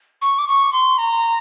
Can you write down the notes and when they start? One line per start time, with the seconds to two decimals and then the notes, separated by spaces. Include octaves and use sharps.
0.22 C#6
0.38 D6
0.47 C#6
0.73 C6
0.98 A#5